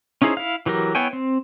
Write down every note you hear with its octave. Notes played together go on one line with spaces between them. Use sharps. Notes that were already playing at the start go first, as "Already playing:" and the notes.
C#4 D#4 E4 G#4 C5
E4 F5
E3 F#3 G4 A#4
B3 E4 C#5 G5 G#5
C4